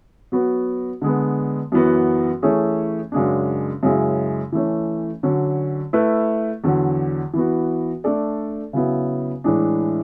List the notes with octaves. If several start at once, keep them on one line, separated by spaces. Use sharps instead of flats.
F#3 B3 F#4
D3 G#3 B3
F#2 E3 B3 F#4
E3 A3 C#4 G#4
F#2 C#3 G#3 D4
F#2 C#3 G#3 C#4 E4
E3 A3 C#4
D3 F#3 C#4
A3 E4 B4
E2 D3 F#3
E3 B3 F#4
A3 D4 A4 D5
C#3 F#3 B3 E4
A2 E3 G#3 D4